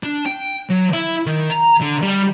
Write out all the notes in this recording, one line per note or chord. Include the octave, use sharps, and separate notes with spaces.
D4
G5
F#3
E4
D#3
A#5
D3
G3